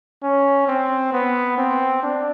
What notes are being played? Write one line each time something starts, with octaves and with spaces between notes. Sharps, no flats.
C#4
C4
B3
C4
D4